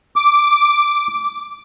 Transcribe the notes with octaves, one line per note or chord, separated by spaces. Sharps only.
D6